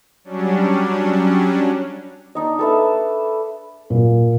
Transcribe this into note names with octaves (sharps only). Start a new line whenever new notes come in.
F#3 G3 C#4 D4
D4 D#4 D#5
A4 B4 E5
A#2